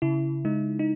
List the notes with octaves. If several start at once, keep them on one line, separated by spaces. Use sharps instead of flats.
C#3 E4
G#3 D#4
D#4